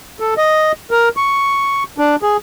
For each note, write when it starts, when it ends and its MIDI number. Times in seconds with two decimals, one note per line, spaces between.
0.20 0.34 69
0.38 0.72 75
0.91 1.09 70
1.17 1.84 85
1.98 2.16 62
2.22 2.37 68